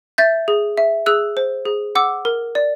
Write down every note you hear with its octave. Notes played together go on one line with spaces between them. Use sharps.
E5 G6 A6
G#4
E5
G#4 E6 F#6
C5
G#4
F#5 D6 E6
A#4
D5